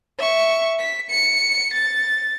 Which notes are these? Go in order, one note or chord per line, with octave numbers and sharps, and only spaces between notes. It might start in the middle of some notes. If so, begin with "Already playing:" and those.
E5 C#6
B6
C#7
A6